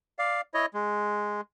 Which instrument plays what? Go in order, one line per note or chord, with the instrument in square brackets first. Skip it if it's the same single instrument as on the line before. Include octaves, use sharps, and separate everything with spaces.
[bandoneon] D5 F5
E4 C#5 D#5
G#3